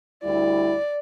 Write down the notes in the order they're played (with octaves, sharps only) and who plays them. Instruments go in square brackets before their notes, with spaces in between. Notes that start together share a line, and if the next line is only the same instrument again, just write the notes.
[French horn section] D2 G3 E4 [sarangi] D5